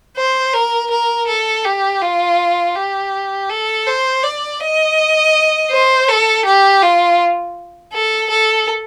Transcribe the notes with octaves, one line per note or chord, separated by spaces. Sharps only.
C5
A#4
A#4
A4
G4
F4
G4
A4
C5
D5
D#5
C5
A4
G4
F4
A4
A4